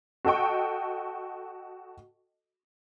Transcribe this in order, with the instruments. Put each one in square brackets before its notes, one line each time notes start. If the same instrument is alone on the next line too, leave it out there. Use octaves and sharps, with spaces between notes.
[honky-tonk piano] F#4 A4 D#5 G5 C#6